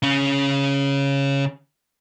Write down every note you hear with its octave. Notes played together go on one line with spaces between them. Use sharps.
C#3 C#4